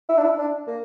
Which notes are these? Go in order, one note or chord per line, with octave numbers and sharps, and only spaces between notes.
E4
D4
E4
D4
A#3